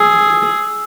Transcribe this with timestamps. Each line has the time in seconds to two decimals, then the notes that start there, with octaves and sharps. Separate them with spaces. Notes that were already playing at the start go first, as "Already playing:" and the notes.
Already playing: G#4 E6